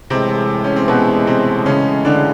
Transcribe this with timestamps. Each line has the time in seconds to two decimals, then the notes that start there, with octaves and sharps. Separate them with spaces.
0.10 A2 C3 E3 G#3 C4
0.64 C#4
0.76 C4
0.88 B2 B3
1.27 C3 C4
1.66 C#3 C#4
2.05 D3 D4